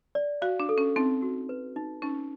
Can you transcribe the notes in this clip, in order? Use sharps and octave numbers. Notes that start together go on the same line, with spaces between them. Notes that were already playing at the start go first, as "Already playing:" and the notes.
D5
F#4 F5
D4
A4
C#4
C4 D#4
F#4
B4
D#4
C#4 D#4